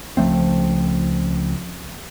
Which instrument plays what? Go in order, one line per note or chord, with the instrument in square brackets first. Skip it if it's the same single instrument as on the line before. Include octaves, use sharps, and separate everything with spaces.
[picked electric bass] C#2 F3 A3 C4